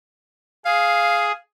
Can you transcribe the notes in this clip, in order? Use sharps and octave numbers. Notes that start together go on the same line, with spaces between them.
G#4 F5